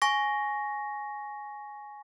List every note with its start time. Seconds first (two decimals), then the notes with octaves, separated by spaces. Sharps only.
0.02 G#5 C#6 A#6